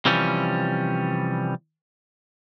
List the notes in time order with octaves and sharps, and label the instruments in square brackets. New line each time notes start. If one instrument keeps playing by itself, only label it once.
[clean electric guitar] C3 E3 F3 G3 C#4